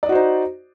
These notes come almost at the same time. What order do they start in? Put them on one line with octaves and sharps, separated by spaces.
D5 D#5 F#4 C5 D#4